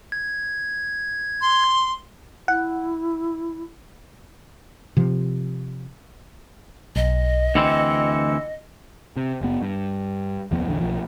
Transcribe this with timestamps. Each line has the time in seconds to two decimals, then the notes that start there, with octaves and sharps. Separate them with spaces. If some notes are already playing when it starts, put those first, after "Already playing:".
0.12 G#6
1.41 C6
2.48 E4 F#5
4.97 C3 F3
6.96 B1 D#5
7.55 D2 E3 C4 C#7
9.17 C3
9.41 F#1 B3
9.62 G2
10.51 F1 D#2 F3 B3
10.67 A#1 E2 D3
10.80 B1 F3